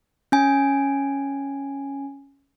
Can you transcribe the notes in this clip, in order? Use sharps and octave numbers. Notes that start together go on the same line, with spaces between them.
C#4 G#5